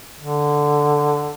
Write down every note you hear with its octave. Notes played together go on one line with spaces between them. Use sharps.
D3